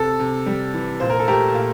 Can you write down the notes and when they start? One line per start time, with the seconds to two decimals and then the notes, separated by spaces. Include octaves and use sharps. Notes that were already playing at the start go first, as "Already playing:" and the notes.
Already playing: C3 A4
0.19 C3
0.46 G3
0.74 E3
1.00 A#2 C5
1.10 A#4
1.19 A4
1.28 A3 G4 A#4
1.54 A#2